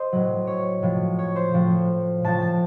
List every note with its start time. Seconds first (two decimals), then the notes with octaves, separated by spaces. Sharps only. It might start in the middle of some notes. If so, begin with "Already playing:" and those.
Already playing: C5 D#5
0.12 A2 F#3
0.47 C#5
0.82 A2 F3
1.19 C#5
1.36 C5
1.54 A2 F3
2.24 A2 F3 A5
2.42 A5